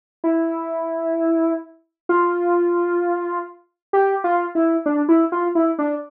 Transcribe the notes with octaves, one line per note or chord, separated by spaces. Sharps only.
E4
F4
G4
F4
E4
D4
E4
F4
E4
D4